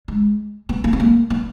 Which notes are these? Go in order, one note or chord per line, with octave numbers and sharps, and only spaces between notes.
G#3
B3
A#3
B3
A#3
B3